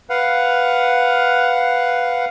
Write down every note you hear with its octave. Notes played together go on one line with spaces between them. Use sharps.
B4 F5 F#5